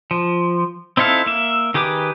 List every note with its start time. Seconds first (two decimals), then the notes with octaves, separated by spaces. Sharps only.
0.11 F3
0.97 C4 D#4 E4 A4 F5
1.26 A#3 E5
1.74 D#3 G4 G#4 B4 D6